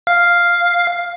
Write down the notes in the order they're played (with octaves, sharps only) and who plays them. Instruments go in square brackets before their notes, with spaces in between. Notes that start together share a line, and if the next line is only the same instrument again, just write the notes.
[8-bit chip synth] F5